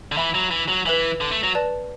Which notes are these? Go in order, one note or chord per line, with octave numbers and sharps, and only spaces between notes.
D3
E3 E5 G#5 B5
F#3
E3
F#3
E3 B4 E5 G#5
D3
A3
F#3
B4 D5 A5